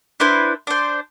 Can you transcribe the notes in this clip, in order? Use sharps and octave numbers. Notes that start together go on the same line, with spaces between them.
D4 E4 B4 C5
D4 C5